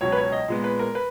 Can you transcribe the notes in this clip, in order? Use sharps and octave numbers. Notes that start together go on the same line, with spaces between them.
C#2 B2 F#3 C#5
B4
C#5
D#5
A#2 G#3 B3
B4
A#4
B4